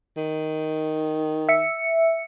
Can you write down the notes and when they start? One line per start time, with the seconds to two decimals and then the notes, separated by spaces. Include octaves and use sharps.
0.17 D#3
1.49 E5 C#7